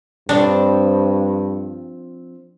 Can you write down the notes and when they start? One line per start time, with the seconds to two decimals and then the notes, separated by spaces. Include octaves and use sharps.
0.29 G2 F3 C4 D4 C#5